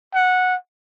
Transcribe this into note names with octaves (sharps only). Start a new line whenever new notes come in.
F#5